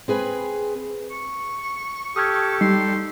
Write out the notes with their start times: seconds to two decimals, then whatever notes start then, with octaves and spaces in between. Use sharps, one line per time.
0.08 C4 G#4 B4 G#5
1.11 C#6
2.16 G4 A4 D#6 F6 G#6
2.61 G3 D#4 C6